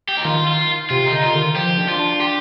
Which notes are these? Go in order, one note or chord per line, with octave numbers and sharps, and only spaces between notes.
G4
D#4
D#3 F4
F4
C3 F4
D#4
D3
F4
D#3
F3 G4
D4
F4
D4
G4